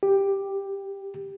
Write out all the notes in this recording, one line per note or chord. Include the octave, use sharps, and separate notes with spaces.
G4